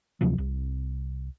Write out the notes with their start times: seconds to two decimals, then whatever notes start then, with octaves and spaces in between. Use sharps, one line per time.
0.21 D2 C3 F3 F#3
0.38 C2